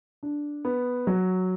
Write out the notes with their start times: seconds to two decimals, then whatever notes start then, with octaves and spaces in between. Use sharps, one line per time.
0.23 D4
0.65 B3
1.07 F#3